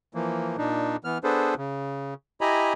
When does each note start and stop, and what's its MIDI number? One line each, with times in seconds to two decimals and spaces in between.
0.15 0.56 52
0.15 0.56 53
0.15 0.56 58
0.58 0.96 46
0.58 0.96 62
0.58 0.96 63
1.04 1.18 52
1.04 1.18 59
1.04 1.18 89
1.24 1.55 59
1.24 1.55 62
1.24 1.55 68
1.24 1.55 69
1.24 1.55 71
1.24 1.55 72
1.58 2.14 49
2.41 2.73 64
2.41 2.73 67
2.41 2.73 75
2.41 2.73 80
2.41 2.73 82
2.41 2.73 83